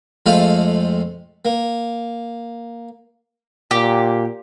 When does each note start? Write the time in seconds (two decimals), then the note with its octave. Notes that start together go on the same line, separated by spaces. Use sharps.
0.26 F2 F3 G#3 A3 F5 B5
1.45 A#3
3.71 A#2 G4